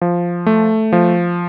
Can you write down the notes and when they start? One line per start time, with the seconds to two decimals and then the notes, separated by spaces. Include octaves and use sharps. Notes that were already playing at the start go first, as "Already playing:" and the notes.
0.01 F3
0.46 A3
0.92 F3